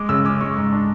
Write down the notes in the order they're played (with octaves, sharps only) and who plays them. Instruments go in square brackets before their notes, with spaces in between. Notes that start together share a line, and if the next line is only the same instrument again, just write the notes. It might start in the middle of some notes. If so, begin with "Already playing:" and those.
Already playing: [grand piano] G#3 D6
C#3 E6
C#4 D6
G#3 C#6
G#2
D4